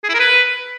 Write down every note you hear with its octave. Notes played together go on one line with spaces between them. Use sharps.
G#4
E4
A#4
B4